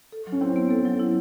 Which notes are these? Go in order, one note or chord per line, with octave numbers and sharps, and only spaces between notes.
A4
F#3
C#4
C4 E4
B3
A4
F#3
E4